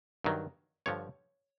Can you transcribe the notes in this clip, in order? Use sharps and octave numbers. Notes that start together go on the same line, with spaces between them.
G2 D#3 F#3
G2 D3 F3 C#5